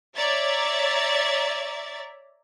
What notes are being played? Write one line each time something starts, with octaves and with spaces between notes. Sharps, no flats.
C#5 D5 E5 A#5 A6